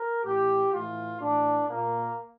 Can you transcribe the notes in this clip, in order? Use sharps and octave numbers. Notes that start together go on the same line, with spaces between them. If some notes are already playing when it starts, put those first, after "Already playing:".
Already playing: A#4
A2 E3 G4
A2 E3 F4
A2 E3 D4
A#2 A#3